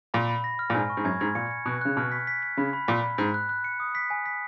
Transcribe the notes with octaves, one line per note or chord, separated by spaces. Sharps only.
A#2 B5
B5
A#6
F6
A#2
G#2 G#5
C#6
G#2
F#2 G#6
G#2 G#6
A#2 C#7
C#7
B2 F#6
C#3 F#6
B2 F6
B6
B6
B6
C#3 B5
B5
A#2 B5
B5
G#2 F#6
F#6
F#6
C#7
D#6
B6
G#5
B6